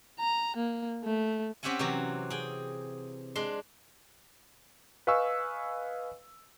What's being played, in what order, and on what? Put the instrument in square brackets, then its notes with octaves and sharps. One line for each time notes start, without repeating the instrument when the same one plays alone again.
[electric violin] A#5
A#3
A3
[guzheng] C4 C#4 G4 E5 F#5 G#5
C3 E3 F#3 F#4
G#4 G5
G#3 D4 C6
[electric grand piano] B4 D#5 F5 G#5 C#6 E6